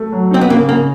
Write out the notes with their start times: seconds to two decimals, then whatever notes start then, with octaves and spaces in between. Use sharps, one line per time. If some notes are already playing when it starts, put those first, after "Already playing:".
Already playing: A3
0.12 F#3
0.31 C4 D#4
0.41 B3
0.50 C#3 A#3
0.68 C#3 A#3